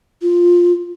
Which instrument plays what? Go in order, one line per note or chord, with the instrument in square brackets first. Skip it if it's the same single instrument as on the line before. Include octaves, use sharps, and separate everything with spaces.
[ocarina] F4